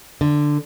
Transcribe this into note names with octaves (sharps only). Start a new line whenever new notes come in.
D3